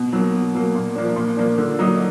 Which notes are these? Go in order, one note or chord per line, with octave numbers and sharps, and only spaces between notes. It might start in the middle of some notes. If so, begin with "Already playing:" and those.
Already playing: B2
F#3 A#3
B2
F#3 A#3
A#2
F3 A#3 D4
A#2
F3 A#3 D4
D3
F#3 A#3 D#4